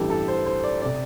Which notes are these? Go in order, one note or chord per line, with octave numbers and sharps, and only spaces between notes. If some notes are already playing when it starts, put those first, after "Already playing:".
Already playing: A1 G2 E3 G4 A4
A4
C5
C5
D5
C3 D5